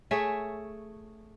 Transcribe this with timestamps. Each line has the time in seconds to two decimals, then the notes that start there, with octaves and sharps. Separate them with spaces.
0.11 A3 G#4 C#5 E5